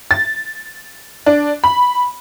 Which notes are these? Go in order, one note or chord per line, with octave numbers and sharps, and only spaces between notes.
A6
D4
B5